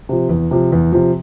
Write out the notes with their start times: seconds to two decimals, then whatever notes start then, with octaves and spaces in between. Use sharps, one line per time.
0.09 C3 F3
0.29 E2
0.51 C3 F3
0.72 E2
0.92 C3 F3